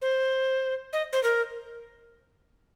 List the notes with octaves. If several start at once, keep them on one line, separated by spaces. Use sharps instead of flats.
C5
D#5
C5
A#4